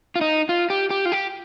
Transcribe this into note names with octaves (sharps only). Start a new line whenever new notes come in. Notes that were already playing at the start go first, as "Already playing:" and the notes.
F4
D#4
F4
G4
G4
F4
G4